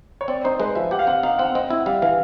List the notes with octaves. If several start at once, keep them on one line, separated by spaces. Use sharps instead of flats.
C#5
C4 D5
D#4 C5
G#3 B4
F3 E5
G4 F#5
F5
C4 F#5
D#4 F5
C4 F#5
C4 D#5
E4
F#5
G3 F5
E5
E3 F5